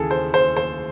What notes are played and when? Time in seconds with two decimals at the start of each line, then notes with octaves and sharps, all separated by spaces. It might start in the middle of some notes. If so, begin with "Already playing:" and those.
Already playing: D#2 C#3 E3 G#4 A4
0.11 C5
0.34 C5
0.57 C5